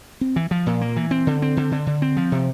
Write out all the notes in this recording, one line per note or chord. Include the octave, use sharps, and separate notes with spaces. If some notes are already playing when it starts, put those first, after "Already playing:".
C4
E3
F3
A#2
A#3
E3
C4
D3
C4
D3
D3
D3
C4
F3
C3